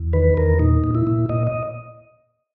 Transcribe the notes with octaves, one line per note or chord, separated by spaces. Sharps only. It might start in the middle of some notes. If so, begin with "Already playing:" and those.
Already playing: E2
D#3 B4
E2 A#4
A#2 D#4
A#2
E4
A#2
A#2 D#5
D#5